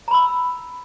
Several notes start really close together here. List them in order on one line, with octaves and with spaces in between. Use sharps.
A#5 B5 E6